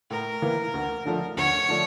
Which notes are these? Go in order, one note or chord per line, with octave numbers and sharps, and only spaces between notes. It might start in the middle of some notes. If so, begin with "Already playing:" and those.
A2 A#4
E3 A#3
D2
D3 F3 A3 D4
D2 C#5
D3 F3 A3 D4